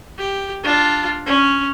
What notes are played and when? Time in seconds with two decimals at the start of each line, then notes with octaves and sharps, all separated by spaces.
0.18 G4
0.64 D4 F4
1.26 C#4